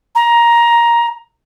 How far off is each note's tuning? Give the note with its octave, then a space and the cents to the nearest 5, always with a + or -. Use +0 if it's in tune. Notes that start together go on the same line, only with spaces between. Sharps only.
A#5 +10